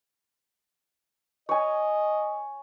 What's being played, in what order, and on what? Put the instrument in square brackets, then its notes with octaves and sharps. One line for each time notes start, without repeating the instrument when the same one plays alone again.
[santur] C#5 G#5 [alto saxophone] D#5